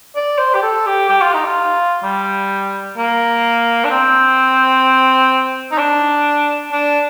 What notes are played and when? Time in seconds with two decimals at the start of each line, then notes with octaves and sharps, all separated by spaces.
0.16 D5
0.38 C5
0.54 G4
0.63 A4
0.86 G4
1.09 G4
1.22 F4
1.33 D#4
1.45 F4
2.03 G3
2.97 A#3
3.84 D4
3.91 C4
5.72 D#4
5.78 D4
6.72 D4